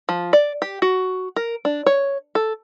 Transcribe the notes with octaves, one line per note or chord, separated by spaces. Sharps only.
F3
D5
G4
F#4
A#4
D4
C#5
A4